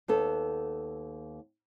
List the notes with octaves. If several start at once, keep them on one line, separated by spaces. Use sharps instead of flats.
D#2 B3 A4